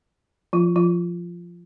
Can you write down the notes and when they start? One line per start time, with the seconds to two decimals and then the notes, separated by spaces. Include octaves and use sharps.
0.53 F3 F4
0.76 F3 F4